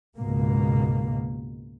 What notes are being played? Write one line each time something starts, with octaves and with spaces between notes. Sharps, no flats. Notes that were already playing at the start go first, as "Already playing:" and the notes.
C#2 G#2 B2 A#3